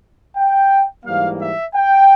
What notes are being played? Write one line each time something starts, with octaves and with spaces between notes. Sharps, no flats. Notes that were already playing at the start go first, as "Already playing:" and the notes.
G5
G#2 E3 G3 A#3 F5
E5
G5